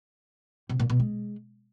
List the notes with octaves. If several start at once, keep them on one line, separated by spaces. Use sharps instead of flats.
C3
A#2
B2
G#3